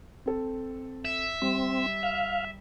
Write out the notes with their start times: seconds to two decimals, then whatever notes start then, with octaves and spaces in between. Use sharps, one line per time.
0.26 C4 A4
1.05 E5
1.42 G3 C4
2.03 F5